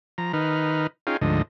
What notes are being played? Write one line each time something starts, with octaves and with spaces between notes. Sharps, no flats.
F3 A#5
D#3 D#4 B4 F6
C#4 D#4 F4 G#4 F5 G5
D2 G#2 D3 F3 D#5